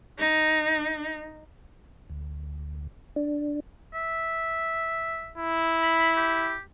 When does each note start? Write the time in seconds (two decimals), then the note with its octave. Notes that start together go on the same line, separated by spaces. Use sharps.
0.19 D#4
2.10 D2
3.16 D4
3.94 E5
5.38 E4
5.82 B5
6.16 G4